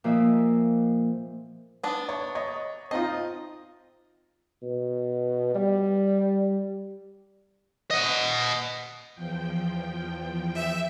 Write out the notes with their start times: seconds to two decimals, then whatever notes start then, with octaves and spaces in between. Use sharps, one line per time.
0.04 A#2 F3 A#3 D#5 E5
1.83 B3 D4
2.09 C#5
2.35 C#5 D#5
2.91 C4 D#4 F4 D#5
4.62 B2
5.55 G3
7.91 D#5 F#5
9.15 E2 F3 G5
10.55 E5